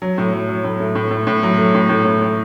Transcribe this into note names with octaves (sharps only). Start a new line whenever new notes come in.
F#3
A2
F#3
F#3
A2
A3
A2
A2
A2
F#3
A3
A2
A2
A2
A2